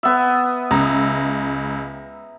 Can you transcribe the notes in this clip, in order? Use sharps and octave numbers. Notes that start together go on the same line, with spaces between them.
B3 E5
C#2 A#5